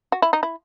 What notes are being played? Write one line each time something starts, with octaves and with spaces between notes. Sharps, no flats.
F#4
E4
D#4
E4